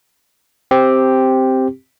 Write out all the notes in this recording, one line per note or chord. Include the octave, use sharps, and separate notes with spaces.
C4 G4